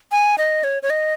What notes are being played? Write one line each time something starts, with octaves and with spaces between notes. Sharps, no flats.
G#5
D#5
C#5
C#5
D#5